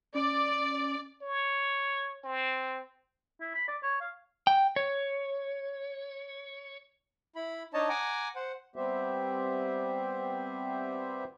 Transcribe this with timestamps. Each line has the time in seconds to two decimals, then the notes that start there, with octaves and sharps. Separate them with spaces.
0.14 C#4 D5
1.22 C#5
2.24 C4
3.40 E4
3.54 B5
3.68 D5
3.83 C#5
4.00 F5
4.47 G5
4.76 C#5
7.35 E4 B5
7.74 D4 D#4 C#5 D#5 A5
7.89 F#5 G#5 A#5 D6
8.36 C5 F#5
8.76 G3 B3 C4 G4 C5 E5